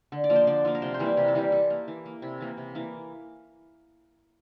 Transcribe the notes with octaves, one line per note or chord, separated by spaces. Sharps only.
D3
D5
F3 A#3
C5
D3 D5
F3 A#3
A#4
C3 C5
C5
E3 G3 A#3
E4
C3 G4
A4
E3 G3 A#3 G4
E3 A4
A#3
E3
A#3
C3 E4
E3 A#3
C3
E3 A#3